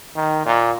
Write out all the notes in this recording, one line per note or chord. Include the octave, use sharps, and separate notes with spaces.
D#3
A#2